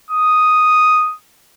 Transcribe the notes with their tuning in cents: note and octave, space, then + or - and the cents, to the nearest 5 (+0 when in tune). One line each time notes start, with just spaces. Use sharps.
D#6 +0